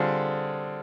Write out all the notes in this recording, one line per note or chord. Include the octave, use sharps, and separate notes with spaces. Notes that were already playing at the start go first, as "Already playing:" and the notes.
Already playing: D3 G3 C4 F4 G#4